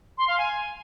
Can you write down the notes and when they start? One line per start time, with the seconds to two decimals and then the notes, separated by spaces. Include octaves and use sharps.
0.17 C6
0.27 F5
0.38 G#5